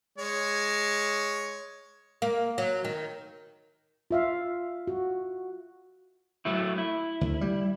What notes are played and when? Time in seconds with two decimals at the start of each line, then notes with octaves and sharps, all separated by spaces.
0.18 G#3 C#5
2.22 A#3
2.58 F#3
2.85 D#3
4.11 F4 E5 F5
4.87 F#4
6.45 F#3 A3 E4
6.78 E4
7.21 D2
7.41 G3